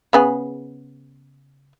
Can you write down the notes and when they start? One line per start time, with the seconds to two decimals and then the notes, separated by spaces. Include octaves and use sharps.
0.13 C#3 B3 G#4